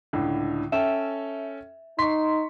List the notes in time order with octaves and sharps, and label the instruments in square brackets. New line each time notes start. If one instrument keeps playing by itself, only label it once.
[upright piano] C#2 A2 D3
[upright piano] C#4 A4 G5 [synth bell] E5
[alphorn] D#4 [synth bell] C6 [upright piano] C#6 B6